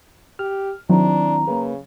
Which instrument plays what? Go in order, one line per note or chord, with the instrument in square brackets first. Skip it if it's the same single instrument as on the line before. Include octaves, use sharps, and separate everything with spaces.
[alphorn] G4 [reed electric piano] F6
[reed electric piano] D#3 C4 E4 [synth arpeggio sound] F#3 [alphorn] D4 [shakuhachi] A#5
[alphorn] C#3 [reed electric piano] A#3 B4